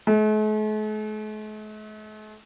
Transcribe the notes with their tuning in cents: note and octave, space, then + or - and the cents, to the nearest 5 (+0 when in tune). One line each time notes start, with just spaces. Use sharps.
A3 -45